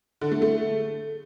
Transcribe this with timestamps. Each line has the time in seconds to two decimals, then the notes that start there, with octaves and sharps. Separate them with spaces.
0.21 D3
0.32 A3
0.42 A3